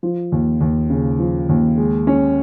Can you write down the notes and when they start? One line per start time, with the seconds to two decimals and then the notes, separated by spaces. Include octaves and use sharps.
0.03 F3
0.32 D#2
0.61 D#2
0.90 C#3
1.19 F3
1.49 D#2
1.77 G#3
2.07 C#4